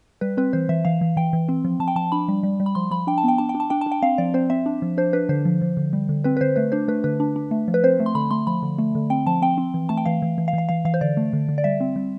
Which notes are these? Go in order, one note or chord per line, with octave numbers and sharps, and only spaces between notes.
G3 B4
C4 B4
E3 C5
E3 E5
E3 F5
E3
E3 G5
E3
C4
F3
F3 A5
G5
F3 A5
D4 B5
G3
G3
G3
B5
F3 C6
F3 B5
D4 G5
A5
B3 G5
D4 A5
G5
D4
A5
D4 G5
D4 A5
G5
C4 F5
F3 D5
C4 C5
C4 E5
D4
F3
D4 C5
D4 B4
D3 C5
F3
F3
D3
G3
D3
C4 B4
B4
D3 C5
A3 B4
D4 C5
A3 B4
D3 B4
D4
D4
A3
F3
B4
C4 C5
A3
C6
D3 B5
A3 C6
F3 B5
D3
A3
D3
C4 G5
F3 A5
C4 G5
C4
E3
A3 A5
G5
E3 F5
E3
E3
F5
E3
F5
E3 F5
E3 F5
C5
D3 D5
A3
D3
D3
D5
G3 E5
C4
G3